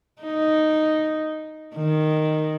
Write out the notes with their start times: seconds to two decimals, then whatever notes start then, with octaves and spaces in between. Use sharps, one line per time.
0.22 D#4
1.76 D#3